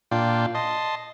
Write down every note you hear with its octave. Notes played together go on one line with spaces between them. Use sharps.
A#2 D4 F4 G5
D#5 A5 C6